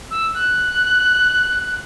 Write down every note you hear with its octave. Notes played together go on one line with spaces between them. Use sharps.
E6
F#6